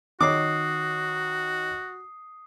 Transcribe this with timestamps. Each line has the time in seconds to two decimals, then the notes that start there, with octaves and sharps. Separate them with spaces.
0.21 D#3 F#4 C#5 D6 D#6 C7